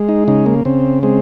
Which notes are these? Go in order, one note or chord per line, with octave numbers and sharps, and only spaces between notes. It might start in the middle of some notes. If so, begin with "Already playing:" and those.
Already playing: G#3
D#4
C#3 D#4
A#3
C#3 C4
G#3 C4